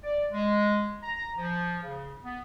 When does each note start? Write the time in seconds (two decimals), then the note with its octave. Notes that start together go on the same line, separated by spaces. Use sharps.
0.03 D5
0.32 G#3
1.02 A#5
1.38 F3
1.83 C#3
2.24 B3